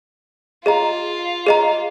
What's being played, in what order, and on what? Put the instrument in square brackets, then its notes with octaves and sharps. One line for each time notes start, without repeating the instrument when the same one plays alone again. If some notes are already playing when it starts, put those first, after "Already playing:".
[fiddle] F4 [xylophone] G#4 D#5 A#5
[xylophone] G#4 D#5 A#5